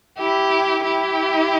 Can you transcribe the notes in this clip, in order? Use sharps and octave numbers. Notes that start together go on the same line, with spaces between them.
E4 G4
E4 G4